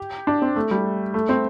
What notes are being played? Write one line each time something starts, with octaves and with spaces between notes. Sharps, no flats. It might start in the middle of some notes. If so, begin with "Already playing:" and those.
Already playing: G4
D4
C4
A3
G3
A3
C4